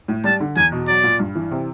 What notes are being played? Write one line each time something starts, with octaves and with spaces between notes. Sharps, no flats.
A2
G3 A5
D3
E2 G#5
B2
F#3 D5
A#2
G2
E3
C3